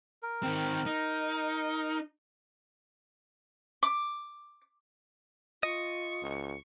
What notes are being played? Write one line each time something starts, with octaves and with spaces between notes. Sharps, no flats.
A#4
D#3 C4
D#4
D6
F4 D#5 C#6
C#2